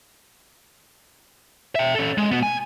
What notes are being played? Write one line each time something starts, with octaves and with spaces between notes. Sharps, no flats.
E5 G5
C#4 A4
G#3
B3 F#4
G#5